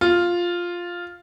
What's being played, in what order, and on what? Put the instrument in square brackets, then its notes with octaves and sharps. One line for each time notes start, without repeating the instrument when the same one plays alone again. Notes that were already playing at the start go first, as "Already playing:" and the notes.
[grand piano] F4